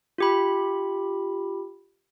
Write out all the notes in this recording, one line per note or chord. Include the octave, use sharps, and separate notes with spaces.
F4 G4 B5